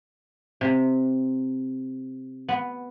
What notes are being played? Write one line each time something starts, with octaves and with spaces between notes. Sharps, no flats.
C3
B3